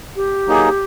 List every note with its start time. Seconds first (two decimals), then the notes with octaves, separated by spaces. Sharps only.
0.16 G4
0.47 F#3 A#3 D#4 G#4